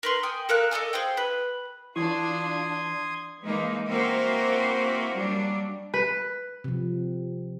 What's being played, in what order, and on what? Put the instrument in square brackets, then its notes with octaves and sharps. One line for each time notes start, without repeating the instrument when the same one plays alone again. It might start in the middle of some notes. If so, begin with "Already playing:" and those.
[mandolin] A#4 B4 C6
G5 G#5 D#6
A4 A#4 F5 F#6
A4 D5 D#5 G#5
G#4 C5 F5 G5
B4
[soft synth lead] E3 [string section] D4 F4 [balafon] E4 [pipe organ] C6 D#6 G#6
[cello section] E3 G#3 A#3 D#4
A#3 C4 E4 F#4 A#4 C5
F#3 G3 A#3 D4
[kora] B4
[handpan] C3 F3